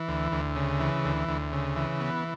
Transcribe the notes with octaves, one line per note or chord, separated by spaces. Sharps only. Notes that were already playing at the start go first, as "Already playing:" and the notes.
Already playing: E3
D2
D2
C#3
E3
D2
D2
C#3
E3
B3